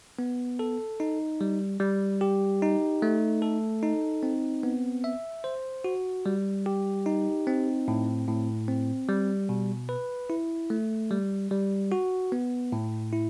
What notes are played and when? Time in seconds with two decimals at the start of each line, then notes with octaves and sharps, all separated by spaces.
0.19 B3
0.59 A4
1.00 D#4
1.41 G3
1.80 G3
2.21 G4
2.62 D#4
3.02 A3
3.42 A4
3.83 D#4
4.23 C4
4.63 B3
5.04 E5
5.44 C5
5.84 F#4
6.26 G3
6.66 G4
7.06 D#4
7.47 C4
7.88 A2
8.28 A2
8.68 C4
9.09 G3
9.49 B2
9.89 B4
10.30 E4
10.70 A3
11.11 G3
11.51 G3
11.92 F#4
12.32 B3
12.72 A2
13.13 E4